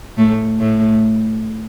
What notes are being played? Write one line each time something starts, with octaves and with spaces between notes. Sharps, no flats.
A2 A3
A2 A3